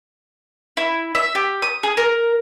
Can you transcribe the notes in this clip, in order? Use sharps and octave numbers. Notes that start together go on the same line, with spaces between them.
E4
E5
G4
D#6
G#4
A#4